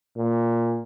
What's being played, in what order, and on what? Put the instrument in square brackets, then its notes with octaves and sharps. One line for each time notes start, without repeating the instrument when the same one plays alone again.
[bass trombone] A#2